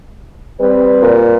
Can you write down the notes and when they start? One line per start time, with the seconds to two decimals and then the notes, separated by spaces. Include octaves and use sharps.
0.60 G3 C4 B4
1.02 A#2